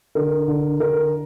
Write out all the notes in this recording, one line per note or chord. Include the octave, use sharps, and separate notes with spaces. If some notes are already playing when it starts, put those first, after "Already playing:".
D3 A#4
D3
D3 A#4